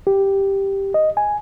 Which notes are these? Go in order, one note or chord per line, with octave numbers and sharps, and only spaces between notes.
G4
D#5
G#5